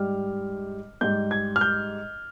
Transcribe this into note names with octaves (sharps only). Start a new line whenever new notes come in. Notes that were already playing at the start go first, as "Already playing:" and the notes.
Already playing: G#2 G3 F6
G#2 G3 G6
G#6
F6
G6